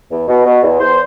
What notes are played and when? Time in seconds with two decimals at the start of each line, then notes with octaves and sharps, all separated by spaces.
0.11 E2
0.28 B2
0.45 B2
0.63 E2
0.79 E2 C5